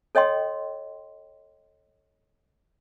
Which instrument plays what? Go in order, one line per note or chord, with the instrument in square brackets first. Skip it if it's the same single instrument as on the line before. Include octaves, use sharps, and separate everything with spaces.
[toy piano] A4 C#5 D#5 G5 C6